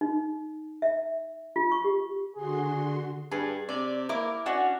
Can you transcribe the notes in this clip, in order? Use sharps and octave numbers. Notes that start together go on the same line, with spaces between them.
D#4
E5
F4
C#6
G4
D3 F#4 G#4 C6
G2 G#4
C3 D5
A#3 E4 A#4 D6
C#4 D4 F#4 F#5